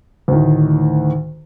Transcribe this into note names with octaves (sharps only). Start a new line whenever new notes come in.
D2 A2 D#3